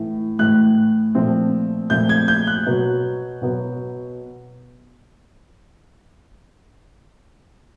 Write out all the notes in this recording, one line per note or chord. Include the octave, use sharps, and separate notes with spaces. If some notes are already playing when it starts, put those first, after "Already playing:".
Already playing: A2 E3 A3
A2 E3 A3 F#6
A#2 F3 A3 C4
A#2 F3 A3 C4 G6
G#6
G6
F#6
B2 F#3 B3
B2 F#3 B3